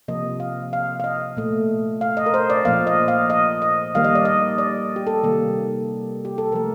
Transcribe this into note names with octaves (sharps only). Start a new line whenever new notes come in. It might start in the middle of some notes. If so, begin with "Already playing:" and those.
C3 F3 A#3 D#5
F5
F5
F5
D#5
A#2 A3
F5
D#5
A#4
C5
D5
A#2 F3 A#3 F5
D#5
F5
D#5
D#5
D#3 G3 A#3 F5
D#5
D5
D#5
D5
G4
A4
C3 D#3 G3 A#3
G4
A4
C3 F3 A3 A#4